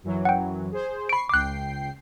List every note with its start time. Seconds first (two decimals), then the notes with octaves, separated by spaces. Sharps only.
0.04 F#2 E3 F#3
0.25 F#5 G5
0.72 G#4 C5
1.09 B5 C#6 C7 D7
1.29 C#2 G5 D6 F#6 C7